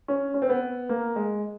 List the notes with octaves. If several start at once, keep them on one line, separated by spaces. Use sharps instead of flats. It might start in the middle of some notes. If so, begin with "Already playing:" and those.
C#4
C#4
C4
B3
A#3
G#3